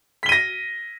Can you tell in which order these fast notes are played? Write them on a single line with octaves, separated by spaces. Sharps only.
B6 G7 D#7 A#6